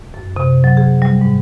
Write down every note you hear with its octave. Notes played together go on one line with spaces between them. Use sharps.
F#2
C3
F#3
G#4
G3
G#2